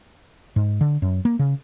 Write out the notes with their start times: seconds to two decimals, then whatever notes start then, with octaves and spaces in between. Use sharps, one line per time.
0.56 G#2
0.81 D3
1.02 F#2
1.25 A#3
1.39 C#3